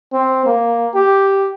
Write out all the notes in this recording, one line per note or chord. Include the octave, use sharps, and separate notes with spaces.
C4
A#3
G4